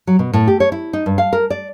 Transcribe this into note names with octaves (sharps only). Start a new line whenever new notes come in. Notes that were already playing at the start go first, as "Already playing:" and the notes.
F#3
B2
A2
G4
C#5
E4
D#4
G2
F5
A#4
D5